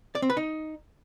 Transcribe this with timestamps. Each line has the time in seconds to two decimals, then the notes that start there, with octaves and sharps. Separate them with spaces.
0.15 D5
0.22 C4
0.30 B4
0.37 D#4